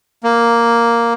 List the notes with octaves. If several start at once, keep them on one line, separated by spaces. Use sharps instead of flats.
A#3